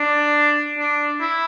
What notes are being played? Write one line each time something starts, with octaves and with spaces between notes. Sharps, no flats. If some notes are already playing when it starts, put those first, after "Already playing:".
Already playing: D4
D4
E4